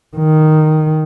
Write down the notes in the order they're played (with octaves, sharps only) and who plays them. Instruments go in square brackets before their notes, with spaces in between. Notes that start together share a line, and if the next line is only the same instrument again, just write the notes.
[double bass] D#3